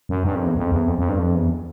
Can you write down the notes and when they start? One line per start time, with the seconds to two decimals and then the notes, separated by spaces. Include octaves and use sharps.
0.09 F#2
0.25 G2
0.35 F2
0.46 E2
0.57 F2
0.72 E2
0.88 F2
0.98 F2
1.09 G2
1.19 F2
1.35 E2